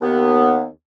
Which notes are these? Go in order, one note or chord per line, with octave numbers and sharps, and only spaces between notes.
D#2 B3